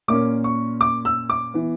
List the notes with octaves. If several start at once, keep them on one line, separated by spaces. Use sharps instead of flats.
A#2 A#3 C#4 D6
C#6
D6
E6
D6
E3 B3